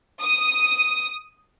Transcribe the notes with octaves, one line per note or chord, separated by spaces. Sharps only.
D#6